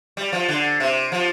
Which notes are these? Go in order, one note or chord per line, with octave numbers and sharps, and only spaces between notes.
G3
F3
D3
C3
F3